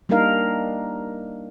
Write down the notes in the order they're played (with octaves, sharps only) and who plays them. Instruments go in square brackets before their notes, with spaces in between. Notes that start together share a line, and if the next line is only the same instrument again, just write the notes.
[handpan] G3 A#3 D4 D#4 A#4 F5